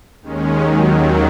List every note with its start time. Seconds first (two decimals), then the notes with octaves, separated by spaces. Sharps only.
0.22 D#2 D#3 G#3 C#4
0.62 D#2 D#3 F#3